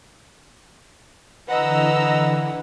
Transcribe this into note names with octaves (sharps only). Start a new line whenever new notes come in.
D3 E3 B4 D#5 F#5 A#5 E6